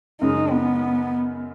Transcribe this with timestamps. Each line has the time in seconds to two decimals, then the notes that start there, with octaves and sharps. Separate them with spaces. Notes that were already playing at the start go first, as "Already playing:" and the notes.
0.21 F#2 C#3 G#3 D#4
0.52 B3